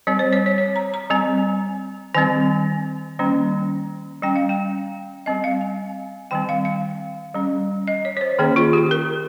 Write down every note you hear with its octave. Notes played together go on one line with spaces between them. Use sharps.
G3 C4 C#5
C5
C#5
C#5
C#5
A#5
A#5
G3 C4 G#5
D#3 G3 C4 G#5
D#3 G3 A#3 C#4
G3 C#4 G5
F5
G5
G3 C4 D#5
F5
G#5
D#3 G3 C4 G5
F5
F5
G3 C#4
D#5
C#5
C#5
C5
D#3 A#3 C#4 G#4
F4
G4
A#4